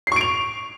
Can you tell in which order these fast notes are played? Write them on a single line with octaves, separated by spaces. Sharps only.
C7 C#6 D7 F7